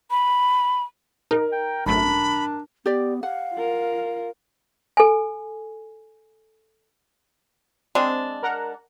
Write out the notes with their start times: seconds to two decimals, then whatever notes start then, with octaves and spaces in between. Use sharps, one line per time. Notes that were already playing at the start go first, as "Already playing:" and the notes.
0.11 B5
1.31 D#4 A#4
1.52 G5
1.86 G#1 F#2 A3 D4 B5
2.86 B3 G4 D5
3.23 F5 F#5
3.53 F4 A#4
4.97 A4 G#5
7.95 G#3 C4 D4
8.43 A#4 F#5 A#5